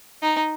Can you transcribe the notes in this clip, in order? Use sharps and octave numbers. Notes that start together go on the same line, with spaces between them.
D#4